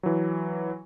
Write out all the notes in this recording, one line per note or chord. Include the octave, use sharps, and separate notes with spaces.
E3 F#3